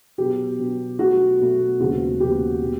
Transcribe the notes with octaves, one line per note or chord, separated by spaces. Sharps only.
B2 F#3 B3 G4
B2 F#3 B3
B2 F#3 A3 F#4
B2 F#3 A3
D#2 C#3 F3 G#3 B3 F#4
D#2 C#3 F3 G#3 B3 G4
B2 G3 A#3